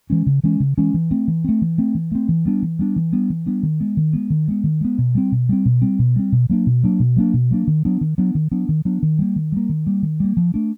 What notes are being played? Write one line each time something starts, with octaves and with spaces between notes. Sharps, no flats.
E3 G#3 C#4
C#3
E3 G#3 C#4
C#3
E3 G#3 C#4
E3
A3 C4
E3
A3 C4
E3
A3 C4
E3
A3 C4
E3
G3 B3 D4
E3
G3 B3 D4
E3
G3 B3 D4
E3
G3 B3 D4
D#3
G#3 B3
D#3
G#3 B3
D#3
G#3 B3
D#3
G#3 B3
B2
G3 C4
B2
G3 C4
B2
G3 C4
B2
G3 C4
B2
F#3 A#3 D4
B2
F#3 A#3 D4
B2
F#3 A#3 D4
B2
F#3 A#3 D4
D#3
F#3 B3 D4
D#3
F#3 B3 D4
D#3
F#3 B3 D4
D#3
F#3 B3 D4
D#3
G3 A#3
D#3
G3 A#3
D#3
G3 A#3
D#3
G3 A#3
F3
A3 D4